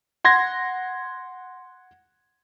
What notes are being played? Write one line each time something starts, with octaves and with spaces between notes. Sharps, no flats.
F#5 C6 G#6 A#6